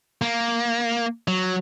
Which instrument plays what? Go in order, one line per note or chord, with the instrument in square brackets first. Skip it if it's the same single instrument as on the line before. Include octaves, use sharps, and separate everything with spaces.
[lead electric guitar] A#3
F#3